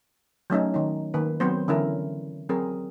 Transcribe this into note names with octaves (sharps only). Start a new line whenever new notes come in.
F#3 A3 C#4 D#4
D#3 D#4
D#3 A#3 B4
F#3 B3 C4 C5
D3 E3 C#4 E4 A#4
F#3 C4 G#4 A#4